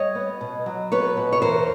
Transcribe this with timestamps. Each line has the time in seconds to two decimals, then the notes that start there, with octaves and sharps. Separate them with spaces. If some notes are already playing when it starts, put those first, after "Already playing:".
Already playing: G3 C#5 D#5
0.15 B3
0.41 B2
0.66 F#3
0.92 B3 B4 C#5
1.17 B2
1.32 C#5
1.42 E2 A#4 C5